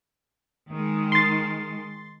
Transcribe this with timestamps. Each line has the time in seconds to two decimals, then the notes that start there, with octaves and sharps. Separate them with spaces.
0.69 D#3 G#3
1.12 C6 A6